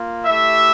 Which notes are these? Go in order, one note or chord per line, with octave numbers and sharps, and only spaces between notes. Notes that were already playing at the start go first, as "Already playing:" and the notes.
Already playing: A#3 F4
A3 E4 G4 E5